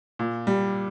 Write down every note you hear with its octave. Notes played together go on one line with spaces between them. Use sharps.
A#2
G3